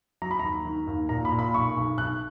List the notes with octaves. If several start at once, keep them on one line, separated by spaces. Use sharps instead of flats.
F#3 A#5
B5
D#2 A#5
D#3
D#2
A#2 A#5
B5
A#2
B5
B1 C#6
B1
B1 F#6